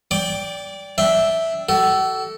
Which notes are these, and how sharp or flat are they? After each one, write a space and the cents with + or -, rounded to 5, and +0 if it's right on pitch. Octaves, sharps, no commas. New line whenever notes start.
D5 -20 G5 +5 D6 +5
D4 -10 E5 -5 G5 +0
F#4 +45 A4 +0